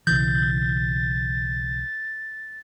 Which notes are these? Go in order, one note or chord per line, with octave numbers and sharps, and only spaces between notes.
B1 C#3 E3 G6 A6